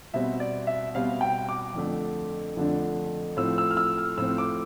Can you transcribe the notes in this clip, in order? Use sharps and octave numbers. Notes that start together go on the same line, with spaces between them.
B2 G3 C4 E5
D5
E5
B2 G3 C4 F5
G5
D6
F2 D3 A3 D4
F2 D3 A3 D4
A2 F3 C4 E6
E6
F6
E6
F6
A2 F3 C4 E6
D6